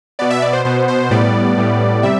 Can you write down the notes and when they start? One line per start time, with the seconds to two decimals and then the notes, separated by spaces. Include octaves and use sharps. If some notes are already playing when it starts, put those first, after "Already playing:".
0.19 B2 B3 D5
0.30 E5
0.42 D5
0.53 C5
0.65 B2 B3 C5
0.88 C5
1.11 A2 G3 B3 D5
1.57 A2 G3 B3
2.03 C3 G3 E5